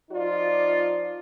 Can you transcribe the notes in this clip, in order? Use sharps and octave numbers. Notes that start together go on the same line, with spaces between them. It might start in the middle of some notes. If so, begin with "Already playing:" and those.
F3 D#4 F4 D5